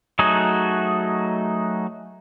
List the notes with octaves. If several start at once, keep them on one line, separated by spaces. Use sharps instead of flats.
F#3 A3 D#4 F#4 G#4